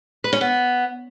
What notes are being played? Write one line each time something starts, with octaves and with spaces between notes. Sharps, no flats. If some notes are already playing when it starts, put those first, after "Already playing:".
B4
C#4
B3